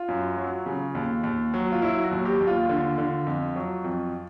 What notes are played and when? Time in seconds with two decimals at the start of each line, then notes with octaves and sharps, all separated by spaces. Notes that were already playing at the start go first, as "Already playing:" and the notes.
Already playing: F4
0.08 F#2
0.37 F#3
0.66 C#3
0.95 D#2
1.23 D#2
1.54 F#3
1.72 F4
1.82 F#3 E4
2.04 F#4
2.11 D#2
2.25 G4
2.40 D#2
2.47 F4
2.69 D3
2.98 D3
3.27 F2
3.56 F#3
3.84 F2